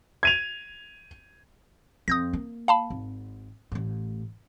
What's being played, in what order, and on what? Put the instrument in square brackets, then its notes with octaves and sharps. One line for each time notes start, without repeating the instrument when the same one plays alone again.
[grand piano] G#6 D#7 F7
[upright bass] F2 [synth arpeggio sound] D#6 G6 A#6
[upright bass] A#3
[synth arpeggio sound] F5 A5 B5
[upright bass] G#1
A1 A2